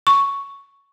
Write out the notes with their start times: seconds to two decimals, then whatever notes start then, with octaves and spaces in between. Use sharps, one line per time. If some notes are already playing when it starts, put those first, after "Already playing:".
0.07 C#6